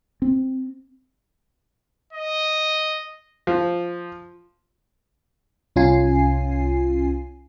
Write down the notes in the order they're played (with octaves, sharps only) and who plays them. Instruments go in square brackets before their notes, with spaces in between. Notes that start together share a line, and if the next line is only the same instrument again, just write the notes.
[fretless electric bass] C4
[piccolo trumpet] D#5
[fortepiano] F3
[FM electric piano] C2 C#4 F4 G#5 C7